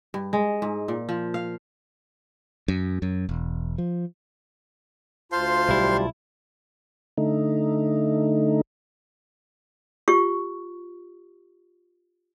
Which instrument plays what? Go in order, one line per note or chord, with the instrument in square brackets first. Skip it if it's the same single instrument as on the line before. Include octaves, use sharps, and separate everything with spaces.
[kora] G2
G#3
G#2
A#2
F3
F5
[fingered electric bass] F#2
F#2
E1
F3
[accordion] D2 F4 A5 [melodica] C5 F5 C6
[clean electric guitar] B1 E4 [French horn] G3
[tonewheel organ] D3 A3 D#4
[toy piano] F4 G4 C#6